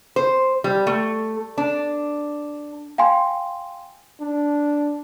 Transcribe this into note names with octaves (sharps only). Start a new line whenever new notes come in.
C5
G3
A3
D4
F5 G5 G#5 C6
D4